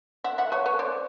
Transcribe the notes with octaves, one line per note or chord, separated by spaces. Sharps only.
E5 F#5
E5 F#5
B4 C#5
B4 C#5
C5 D5